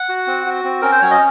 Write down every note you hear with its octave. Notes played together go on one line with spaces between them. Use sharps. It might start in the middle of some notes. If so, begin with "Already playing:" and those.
Already playing: F#5
F#4
C4
F#4
C4
C#4 A#4
C5
F#3 C#5
D#5